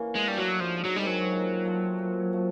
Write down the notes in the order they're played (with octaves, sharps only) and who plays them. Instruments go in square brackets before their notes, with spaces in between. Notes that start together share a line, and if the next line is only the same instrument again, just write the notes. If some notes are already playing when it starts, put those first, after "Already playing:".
Already playing: [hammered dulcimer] E3 A#3 C#4
[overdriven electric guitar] G#3
[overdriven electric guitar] G3 [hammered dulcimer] A3 D4 F#4
[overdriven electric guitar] F#3
[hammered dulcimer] G#2 [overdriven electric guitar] F3
[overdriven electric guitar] F#3
[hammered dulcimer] D#3 G#3 C4 [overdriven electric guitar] G3
[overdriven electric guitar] F#3
[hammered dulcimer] A#2
F3 A3 C4
A#2
F3 A3